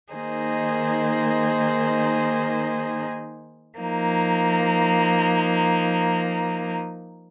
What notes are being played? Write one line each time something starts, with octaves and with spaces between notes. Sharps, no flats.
D#3 A#3 D#4 G#4 C5
F3 A#3 D#4